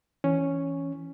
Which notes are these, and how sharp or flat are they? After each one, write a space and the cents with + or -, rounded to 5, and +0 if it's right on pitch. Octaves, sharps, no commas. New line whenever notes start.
E3 +0 C#4 +0